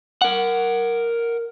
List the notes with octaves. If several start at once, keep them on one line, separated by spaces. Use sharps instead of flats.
A#4 F#5